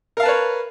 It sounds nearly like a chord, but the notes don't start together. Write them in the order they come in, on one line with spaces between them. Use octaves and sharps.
A#4 F5 A5 B4 C#5